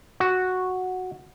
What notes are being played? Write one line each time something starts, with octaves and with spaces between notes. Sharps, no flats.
F#4